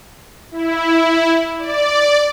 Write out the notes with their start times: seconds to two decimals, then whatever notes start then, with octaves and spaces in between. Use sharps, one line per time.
0.51 E4
1.58 D5